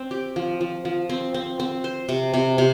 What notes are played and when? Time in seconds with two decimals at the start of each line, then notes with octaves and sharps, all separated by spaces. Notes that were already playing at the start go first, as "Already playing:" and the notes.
Already playing: C4
0.11 G4
0.36 F3
0.61 F3
0.85 F3
1.09 C4
1.34 C4
1.60 C4
1.84 C5
2.09 C3
2.34 C3
2.58 C3